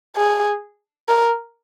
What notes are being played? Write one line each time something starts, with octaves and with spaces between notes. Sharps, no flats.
G#4
A#4